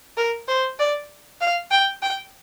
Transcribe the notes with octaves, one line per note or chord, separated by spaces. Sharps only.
A#4
C5
D5
F5
G5
G5